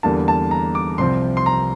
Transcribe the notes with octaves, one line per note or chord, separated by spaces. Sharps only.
E2 D3 G3 A#3 A5
A5
A#5
D6
C2 C3 F3 C4 C6
C6
A#5